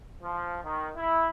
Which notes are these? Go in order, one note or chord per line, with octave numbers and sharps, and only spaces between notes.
F3
D#3
E4